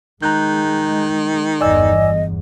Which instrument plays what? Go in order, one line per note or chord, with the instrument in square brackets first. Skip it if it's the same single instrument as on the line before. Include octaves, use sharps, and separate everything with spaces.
[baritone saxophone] D#3 [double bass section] G#3 [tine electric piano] A#5 F#6 G6
[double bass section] G1 E2 [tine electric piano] D5 G#5 E6 [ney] D#5